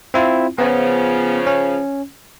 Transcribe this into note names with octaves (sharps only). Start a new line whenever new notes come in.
C4 E4 F4
C#3 F3 B3
C#4